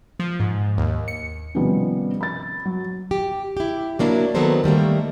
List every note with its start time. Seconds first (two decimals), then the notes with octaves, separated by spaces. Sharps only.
0.20 F3
0.40 G#2
0.78 D#2
1.08 C#7
1.55 C3 D#3 F3 G3 B3 C#4
2.21 B5 A6
2.65 F#3
3.11 G4
3.57 E4 G4
3.99 F#3 A#3 D4 E4
4.35 D#3 F#3 B3 A4 A#4 C5
4.64 D#3 G3 A3 A#3